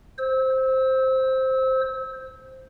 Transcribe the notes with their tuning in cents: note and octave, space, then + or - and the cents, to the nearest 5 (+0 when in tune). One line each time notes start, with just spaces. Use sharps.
C5 +5 E6 -25